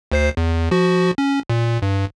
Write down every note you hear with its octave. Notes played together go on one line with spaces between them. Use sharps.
D2 C5 C7
E2
F3 F#4
C#4
A#2
G2